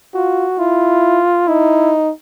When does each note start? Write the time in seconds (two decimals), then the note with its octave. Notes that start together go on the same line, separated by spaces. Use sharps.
0.14 F4 F#4
0.59 E4 F4
1.47 D#4 E4